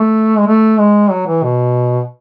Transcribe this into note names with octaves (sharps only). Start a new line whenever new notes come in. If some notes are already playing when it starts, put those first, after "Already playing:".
Already playing: A3
G#3
A3
G#3
F#3
E3
B2